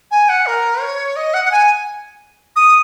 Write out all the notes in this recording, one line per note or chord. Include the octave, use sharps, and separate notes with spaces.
G#5
F#5
A#4
C#5
D#5
F#5
F#5
G#5
D#6